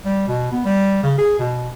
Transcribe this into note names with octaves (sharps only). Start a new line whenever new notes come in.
G3
B2
B3
G3
C#3
G#4
B2